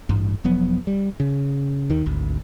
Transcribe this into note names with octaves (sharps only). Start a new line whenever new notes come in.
A1 G2
E1 F3 F#3 B3
G3
C#3
D#2 D#3
G#1 D2